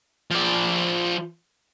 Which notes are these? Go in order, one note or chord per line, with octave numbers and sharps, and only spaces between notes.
F3 D5